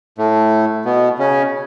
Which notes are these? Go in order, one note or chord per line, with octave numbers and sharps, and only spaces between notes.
A2 A3
B2 B3
C#3 C#4